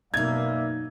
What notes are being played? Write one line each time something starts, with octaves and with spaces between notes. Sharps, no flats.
F#2 B2 A#3 D#4 D5 E5 F5 G#6